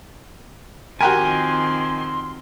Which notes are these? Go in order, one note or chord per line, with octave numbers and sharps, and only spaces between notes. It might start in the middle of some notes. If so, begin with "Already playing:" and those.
D#3 F3 C4 F#4 G4 A#4 G#5 C6